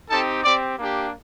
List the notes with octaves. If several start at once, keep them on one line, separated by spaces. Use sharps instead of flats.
C4 D#4 G4 A4 A5
C4 G4 D5 D6
A#3 D4 G4